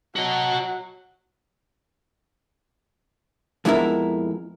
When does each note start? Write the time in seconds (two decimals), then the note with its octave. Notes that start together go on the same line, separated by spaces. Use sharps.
0.16 F#3 F#4 D#5
3.65 F2 G#3 B3 E4 A#4 E5